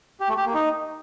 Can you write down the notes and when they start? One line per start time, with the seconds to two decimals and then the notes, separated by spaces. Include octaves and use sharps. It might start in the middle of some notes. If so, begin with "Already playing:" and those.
0.20 G4
0.29 A3
0.37 G4
0.46 A#3
0.54 D#4